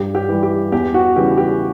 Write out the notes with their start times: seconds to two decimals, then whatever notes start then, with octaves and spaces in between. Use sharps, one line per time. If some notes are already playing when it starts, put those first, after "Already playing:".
Already playing: G2 G4
0.15 G4
0.28 E3 G3
0.43 G4
0.72 E2 G4
0.94 F#4
1.16 C#3 E3 G3 G4
1.38 G4